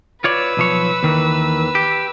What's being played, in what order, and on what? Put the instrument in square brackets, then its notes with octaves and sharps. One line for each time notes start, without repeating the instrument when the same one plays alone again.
[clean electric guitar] F4 C#5 D5 [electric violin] B4 E6
[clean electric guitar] B1 F3 C#5
D#2 D#3 E3
G4